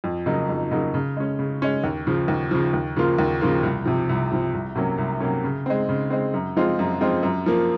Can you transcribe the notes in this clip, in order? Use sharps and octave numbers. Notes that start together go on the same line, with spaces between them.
F2
C#3 F#3 A#3 D#4
F2
C#3 F#3 A#3 D#4
C#3
G#3 C#4
C#3
G#3 C#4
D#2
C#3 F3
D#2
C#3 F3
D#2
C#3 F3 A#3 F4
D#2
C#3 F3 A#3 F4
C2
C3 F3
C2
C3 F3
C2
C3 F#3 A#3 C#4
C2
C3 F#3 A#3 C#4
C#3
G#3 C4
C#3
G#3 C4
F#2
F3 G#3 C4 F4
F#2
F3 G#3 C4 F4
F#2
F3 A#3